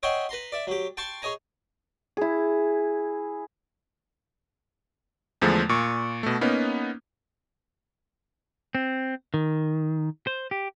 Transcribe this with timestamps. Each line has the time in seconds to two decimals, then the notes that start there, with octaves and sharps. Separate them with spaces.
0.03 C#5 D#5 E5 F#5 G5 C6
0.29 B4 A#5 C6
0.52 D5 E5
0.67 F#3 G4
0.97 G5 A5 C6 C#6
1.22 G#4 C#5 D#5 G#5 A#5
2.17 E4 G#4
5.42 E2 D3 F3 G#3 A3
5.69 A#2 C#6
6.23 B2 A3
6.41 A#3 B3 C#4 D#4
8.75 C4
9.34 D#3
10.27 C5
10.51 G4